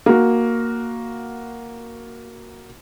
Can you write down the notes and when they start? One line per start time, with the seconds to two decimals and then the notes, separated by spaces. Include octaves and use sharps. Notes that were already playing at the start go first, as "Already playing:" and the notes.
0.06 A#3 F#4